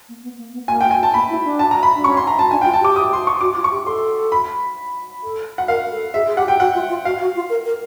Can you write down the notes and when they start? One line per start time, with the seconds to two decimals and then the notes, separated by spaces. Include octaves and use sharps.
0.09 A#3
0.23 B3
0.38 A#3
0.53 B3
0.68 A#3 G#5
0.81 G5
0.91 G#5
1.03 A5
1.14 A#3 B5
1.30 E4
1.44 D4
1.59 A5
1.71 A#5
1.83 B5
1.95 D4
2.04 C#4 C#6
2.17 C6
2.27 A#5
2.39 A5
2.51 D4 G#5
2.61 G5
2.66 F4
2.74 A5
2.81 G4 D6
2.96 D#6
3.13 C6
3.27 C#6
3.41 F#4 D6
3.56 F4
3.64 C#6
3.71 G4
3.86 A4 C6
4.32 B5
5.24 A4
5.58 F#5
5.68 A#4 F5
5.91 A4
6.14 G#4 E5
6.27 G#4
6.36 G4 F#5
6.48 G5
6.59 F#4 F#5
6.74 F4
6.89 F4
7.05 F#4 F5
7.21 F#4
7.36 F4
7.50 A#4
7.65 A#4